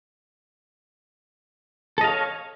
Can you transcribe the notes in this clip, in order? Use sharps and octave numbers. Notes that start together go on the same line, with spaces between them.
A4 C#5 D#5 F5